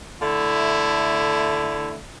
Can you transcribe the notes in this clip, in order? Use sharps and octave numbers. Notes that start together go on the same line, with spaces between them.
D3 A3 E4